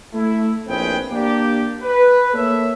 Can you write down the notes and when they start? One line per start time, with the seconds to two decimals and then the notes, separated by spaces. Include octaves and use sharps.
0.13 A3 E4
0.67 A#1 A2 C4 G#4 B4 G5
1.11 A#3 D4 G4
1.82 B4
2.34 A#3 A4 C#5 E5